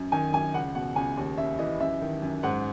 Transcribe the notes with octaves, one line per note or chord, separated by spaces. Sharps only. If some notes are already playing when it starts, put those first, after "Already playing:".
Already playing: F#2
D#3 G#5
F#2 G#5
C#2 F#5
B2 F#5
C#2 G#5
D#2
C#3 E5
E3 D#5
F#2 E5
D#3
F#2
G#2 F#5